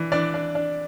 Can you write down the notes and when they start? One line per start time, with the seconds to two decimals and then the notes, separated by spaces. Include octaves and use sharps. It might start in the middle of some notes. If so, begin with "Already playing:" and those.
Already playing: E3 D4
0.12 E3 D4 D5
0.34 D4
0.55 D4